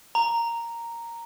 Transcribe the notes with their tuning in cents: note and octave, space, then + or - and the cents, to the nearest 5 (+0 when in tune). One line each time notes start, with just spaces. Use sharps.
A#5 -5